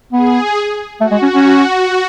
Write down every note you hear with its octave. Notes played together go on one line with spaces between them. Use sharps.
B3 G#4
A3 F#4
G#3
C#4
C#4